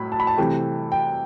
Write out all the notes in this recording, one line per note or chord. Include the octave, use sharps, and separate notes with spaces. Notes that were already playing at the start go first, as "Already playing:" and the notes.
Already playing: A2 F#3 B5
A5
B5
A5
C3 E3 A3 G5
G5